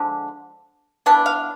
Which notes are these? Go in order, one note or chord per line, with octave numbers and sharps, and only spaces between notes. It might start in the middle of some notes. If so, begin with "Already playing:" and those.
Already playing: D3 F3 G#3 D4
E3 B3 D4 A5
F5